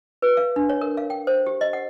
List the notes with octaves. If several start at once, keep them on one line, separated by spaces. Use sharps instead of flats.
B4
F5
D4
C#5
A#4
F5
G5
C5
G4
D#5
F#5